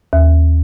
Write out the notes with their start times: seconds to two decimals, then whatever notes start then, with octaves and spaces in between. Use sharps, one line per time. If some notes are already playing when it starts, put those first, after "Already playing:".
0.13 D#2